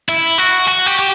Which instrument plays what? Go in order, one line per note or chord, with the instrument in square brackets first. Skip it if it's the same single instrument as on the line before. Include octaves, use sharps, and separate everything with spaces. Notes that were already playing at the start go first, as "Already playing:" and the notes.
[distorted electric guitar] E4
F#4
F#4
G4
G4